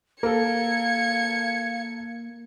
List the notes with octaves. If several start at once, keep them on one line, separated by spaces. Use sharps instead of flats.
A#3 A4 A#4 F5 G#6 C#7